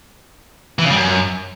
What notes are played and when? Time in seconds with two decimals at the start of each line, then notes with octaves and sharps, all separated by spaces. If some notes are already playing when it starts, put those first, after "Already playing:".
0.79 E3
0.84 C#3
0.90 G3
0.96 F#2